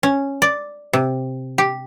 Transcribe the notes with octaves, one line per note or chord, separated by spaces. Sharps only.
C#4
D5
C3
G4